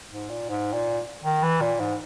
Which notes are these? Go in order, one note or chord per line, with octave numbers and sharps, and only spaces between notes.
G#2
A#2
G#2
A#2
D#3
E3
A#2
G#2